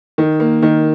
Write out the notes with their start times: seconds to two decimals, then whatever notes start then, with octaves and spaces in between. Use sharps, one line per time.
0.18 D#3
0.40 A#3
0.62 D#3